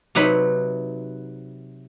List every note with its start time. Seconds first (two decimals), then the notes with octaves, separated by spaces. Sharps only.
0.15 C3 F#3 D#4 B4 B5